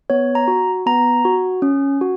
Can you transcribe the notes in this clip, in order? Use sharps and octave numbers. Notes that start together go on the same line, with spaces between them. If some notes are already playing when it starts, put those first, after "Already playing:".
B3 C#5
A#5
F#4
B3 A#5
F#4
C#4
F#4